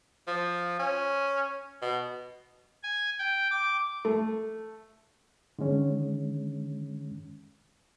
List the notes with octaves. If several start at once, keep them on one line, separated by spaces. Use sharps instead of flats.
F3
C#4
B2
G#5
G5
D6
A3
D3 D#3 G#3 C#4